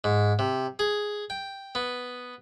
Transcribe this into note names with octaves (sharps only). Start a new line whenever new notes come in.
G#2
C3
G#4
G5
B3